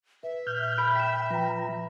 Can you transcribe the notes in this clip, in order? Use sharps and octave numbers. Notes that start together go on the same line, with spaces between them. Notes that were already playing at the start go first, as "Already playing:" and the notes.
B4 E5
A#2 F6 G6
B5 D7
G5 B6 E7
F3 B4 G5 A#5